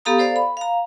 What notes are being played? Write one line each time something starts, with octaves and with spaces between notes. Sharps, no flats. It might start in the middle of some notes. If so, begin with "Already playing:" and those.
B3 G4 A4 F5 A#5 D#6
A4 C5 D5 F5
B5
F5 A#5